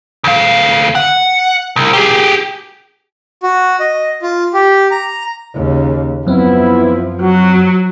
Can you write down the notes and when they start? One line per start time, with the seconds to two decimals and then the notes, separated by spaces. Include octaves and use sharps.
0.24 D2 F5
0.95 F#5
1.76 C2
1.93 G4 G#4
3.43 F#4
3.80 D#5
4.22 F4
4.54 G4
4.91 A#5
5.54 D#2 C#3
6.27 F#2 F3 B3 C4 E4
7.20 F#3 F#4